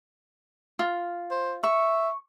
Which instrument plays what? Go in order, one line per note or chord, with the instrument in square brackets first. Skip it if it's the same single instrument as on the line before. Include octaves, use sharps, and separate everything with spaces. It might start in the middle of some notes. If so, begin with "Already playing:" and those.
[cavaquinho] F4
[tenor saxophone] C5
[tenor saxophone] E5 [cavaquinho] C#6